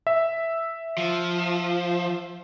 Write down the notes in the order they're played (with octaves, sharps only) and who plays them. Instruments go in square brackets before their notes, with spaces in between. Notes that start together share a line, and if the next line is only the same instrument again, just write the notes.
[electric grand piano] E5
[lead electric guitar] F3